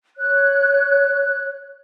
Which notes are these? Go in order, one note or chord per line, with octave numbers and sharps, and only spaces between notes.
C#5 F#6